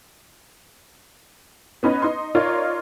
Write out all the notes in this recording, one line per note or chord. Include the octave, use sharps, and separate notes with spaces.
B3 C#4 D#4 B4
D#4 C6
D#4 F4 A#4 C#5 D5